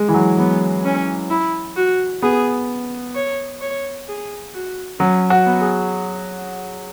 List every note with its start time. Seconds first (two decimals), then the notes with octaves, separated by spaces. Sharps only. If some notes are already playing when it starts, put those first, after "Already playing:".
Already playing: G#3
0.09 E3
0.14 F#3
0.37 F#3 B3
0.84 C#4
1.30 E4
1.76 F#4
2.22 B3 G#4
3.15 C#5
3.61 C#5
4.08 G#4
4.54 F#4
4.99 F#3 C#4
5.30 F#4
5.46 B3
5.61 G#4